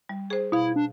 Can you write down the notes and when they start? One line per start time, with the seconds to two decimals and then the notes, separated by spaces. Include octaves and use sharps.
0.09 G3
0.30 G#4 C5
0.52 B2 E4 F5
0.76 D4